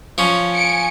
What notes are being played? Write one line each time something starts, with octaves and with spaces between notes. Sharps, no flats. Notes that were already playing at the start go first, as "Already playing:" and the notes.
F3 C#4
G#5 C#7 D7